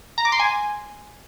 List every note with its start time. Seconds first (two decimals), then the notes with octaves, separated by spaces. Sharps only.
0.18 A#5
0.25 D6
0.32 C6
0.39 G#5